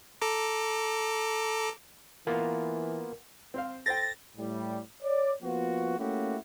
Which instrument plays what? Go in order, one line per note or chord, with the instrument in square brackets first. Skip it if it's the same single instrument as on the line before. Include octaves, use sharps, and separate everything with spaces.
[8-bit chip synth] A4 A#5 D6
[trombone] E3 [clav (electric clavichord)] A#3 B3 F4 [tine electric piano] A#4
[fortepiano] C4 C5 F5
[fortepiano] A4 C5 G5 [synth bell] A6 A#6
[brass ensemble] A2 G3
C#5 D5
F3 A#3 B3 F4 F#4
A3 A#3 C#4 E4 F#4 G4